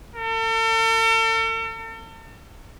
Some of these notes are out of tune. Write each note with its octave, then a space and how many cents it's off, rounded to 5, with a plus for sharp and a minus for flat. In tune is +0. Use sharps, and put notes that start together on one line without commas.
A4 +40